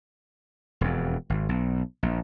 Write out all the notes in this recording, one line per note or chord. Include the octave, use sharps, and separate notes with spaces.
E1 F2
G#1
B1
A#1